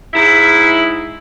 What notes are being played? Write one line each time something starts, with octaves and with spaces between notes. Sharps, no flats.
G#2 E4